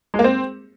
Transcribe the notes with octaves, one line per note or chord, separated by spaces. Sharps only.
G#3
A#3
C4